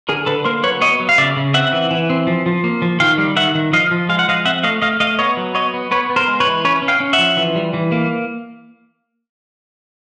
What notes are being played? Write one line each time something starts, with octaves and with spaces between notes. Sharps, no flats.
D3 G#4 A#4
D3 A4 B4
A#3 A#4 C5
F#3 B4 C#5
B3 C#5 D#5
F#3
F5
C#3 D5 E5
C#3
C4 E5 F#5
E3
E3
C4
F3
F3
A#3
F3
D#3 F5 G5
G3
D#3 E5 F#5
D#3
F3 D#5 F5
F3
G#3 F5
F#5
F3 D#5 F5
C4 E5 F#5
A3 D#5 F5
A3 D#5 F5
A3 D#5 F5
B3 C#5 D#5
F#3
B3 C#5 D#5
B3
B3 B4 C#5
B3
A#4 C5
G#3
B4 C#5
E3
C#4 B4 C#5
C#4
F5 G5
C#4
E5 F#5
F3
E3
G3
E3
A#3